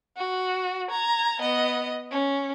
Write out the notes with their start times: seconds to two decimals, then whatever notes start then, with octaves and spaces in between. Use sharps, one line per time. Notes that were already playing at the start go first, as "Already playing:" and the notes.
0.17 F#4
0.91 A#5 G#6
1.41 B3 D#5
2.11 C#4